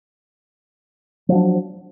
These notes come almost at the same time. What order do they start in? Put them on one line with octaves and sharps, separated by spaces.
F3 F#3 D4